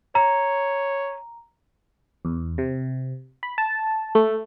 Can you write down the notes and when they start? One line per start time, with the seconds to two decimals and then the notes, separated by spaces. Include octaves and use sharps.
0.15 C#5 A#5
2.25 E2
2.58 C3
3.43 B5
3.58 A5
4.15 A3